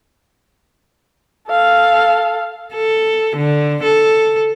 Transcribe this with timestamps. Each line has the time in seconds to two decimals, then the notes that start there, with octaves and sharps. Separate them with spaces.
1.49 A4 F5
2.74 A4
3.37 D3
3.84 A4